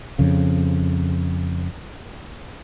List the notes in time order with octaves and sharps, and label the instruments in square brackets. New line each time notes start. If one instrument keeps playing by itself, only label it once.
[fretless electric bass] F2 C#3